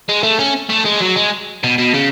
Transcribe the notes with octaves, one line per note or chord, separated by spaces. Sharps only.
G#3
A3
C#4
A3
G#3
F#3
G#3
B2
B2
C#3